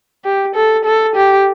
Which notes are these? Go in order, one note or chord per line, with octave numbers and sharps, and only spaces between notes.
G4
A4
A4
G4